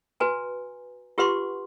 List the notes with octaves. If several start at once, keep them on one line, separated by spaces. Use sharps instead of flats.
F#4 B4 G#5 A#5
F4 G4 B4 F#5 C6 C#6